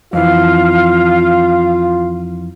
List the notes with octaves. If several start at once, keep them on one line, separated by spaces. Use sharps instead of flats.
F2 E3 F4 F5